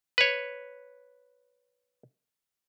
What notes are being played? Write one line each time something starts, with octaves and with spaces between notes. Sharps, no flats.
B4 C#5